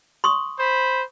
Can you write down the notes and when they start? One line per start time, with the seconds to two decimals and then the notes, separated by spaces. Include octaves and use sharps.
0.24 C6 C#6 D#6
0.57 C5 B5